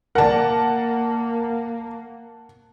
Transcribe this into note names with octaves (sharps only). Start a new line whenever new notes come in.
A#3 A#4 D5 F#5 A5